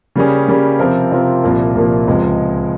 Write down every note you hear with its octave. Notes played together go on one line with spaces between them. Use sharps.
C#3 G3 A#3 C#4 G#4
C#3 G3 A#3 C#4 G#4
C3 F3 C4 F4 A#4
C3 F3 C4 F4 A#4
C2 A#2 F3 A#3
C2 A#2 F3 A#3
C#2 C3 F3 G#3